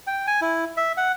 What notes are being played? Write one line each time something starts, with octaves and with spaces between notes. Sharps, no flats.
G5
G#5
E4
E5
F#5